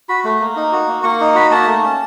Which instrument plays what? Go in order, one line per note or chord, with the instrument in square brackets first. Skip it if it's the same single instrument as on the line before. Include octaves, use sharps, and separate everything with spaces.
[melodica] F#4 B5
A3
A#3
D#4
F#4
A#3
A#3 C#6
D#4 C#6
F#4 B5
A#3 A5
A3
C#4